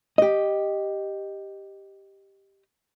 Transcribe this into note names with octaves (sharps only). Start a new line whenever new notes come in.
G4 D#5